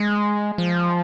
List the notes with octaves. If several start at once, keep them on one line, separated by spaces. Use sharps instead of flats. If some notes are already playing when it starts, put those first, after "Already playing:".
Already playing: G#3
F3